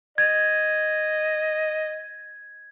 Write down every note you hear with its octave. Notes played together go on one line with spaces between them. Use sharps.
D#5 G#6